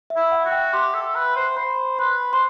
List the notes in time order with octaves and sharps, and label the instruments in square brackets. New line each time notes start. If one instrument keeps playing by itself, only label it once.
[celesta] E5
[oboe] E4
[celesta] F#5
[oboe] F#4
[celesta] G5
[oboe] G4 [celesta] C6
[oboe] A4
B4
C5
[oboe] C5 [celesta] B5
[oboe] B4 [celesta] C6
[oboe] C5 [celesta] C6